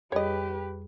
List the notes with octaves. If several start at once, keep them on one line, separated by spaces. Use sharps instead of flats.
F2 G3 G4 G#4 B4 C#5 D#5